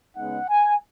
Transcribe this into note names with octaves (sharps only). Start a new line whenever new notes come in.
C#3 G#3 B3 D#4 F#5
G#5